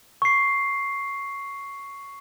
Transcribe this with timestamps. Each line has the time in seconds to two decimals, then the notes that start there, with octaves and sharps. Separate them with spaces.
0.22 C#6 C7